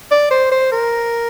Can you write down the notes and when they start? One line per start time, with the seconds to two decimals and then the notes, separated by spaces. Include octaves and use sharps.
0.11 D5
0.31 C5
0.52 C5
0.72 A#4